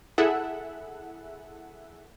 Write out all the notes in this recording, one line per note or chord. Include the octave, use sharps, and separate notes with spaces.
E4 G#4 A4 E5 F#5